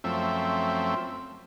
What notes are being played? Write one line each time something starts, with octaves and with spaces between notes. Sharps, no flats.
F#2 F3 A3 C4 E5